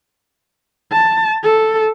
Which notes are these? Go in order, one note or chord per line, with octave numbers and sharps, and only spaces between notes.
A5
A4